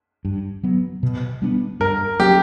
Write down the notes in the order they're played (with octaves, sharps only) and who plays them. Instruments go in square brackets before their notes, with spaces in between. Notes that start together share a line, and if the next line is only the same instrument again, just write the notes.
[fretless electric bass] G2
F#3 B3
B2
G3 B3 D4
[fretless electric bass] G2 [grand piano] A#4
[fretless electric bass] F#3 A#3 C#4 [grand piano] G4